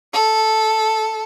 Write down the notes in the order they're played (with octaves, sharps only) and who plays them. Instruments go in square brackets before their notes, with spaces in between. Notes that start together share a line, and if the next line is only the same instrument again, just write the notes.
[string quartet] A4